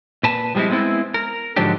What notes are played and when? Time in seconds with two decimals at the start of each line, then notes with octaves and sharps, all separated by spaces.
0.23 A#2 B4 A5
0.55 F3 G3 G#3 C4 E4
0.70 G#3 A3 B3 C4 E4
1.14 A#4
1.56 G#2 D3 F3 F#3 D4 G4